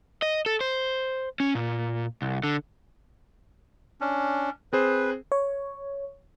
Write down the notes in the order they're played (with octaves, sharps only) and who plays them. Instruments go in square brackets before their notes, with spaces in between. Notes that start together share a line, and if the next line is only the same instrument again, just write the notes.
[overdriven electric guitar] D#5
A4
C5
C#4
A#2
C2
D3
[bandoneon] C#4 D4
[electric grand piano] C4 G#4 C5 [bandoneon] B4
[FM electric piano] C#5